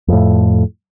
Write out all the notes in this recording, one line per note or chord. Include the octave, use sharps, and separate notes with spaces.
F2 A2